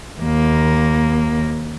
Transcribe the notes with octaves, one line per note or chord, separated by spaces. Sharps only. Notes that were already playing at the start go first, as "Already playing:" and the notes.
D#2 A#3